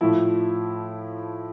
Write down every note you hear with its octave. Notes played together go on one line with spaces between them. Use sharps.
A2 F3 E4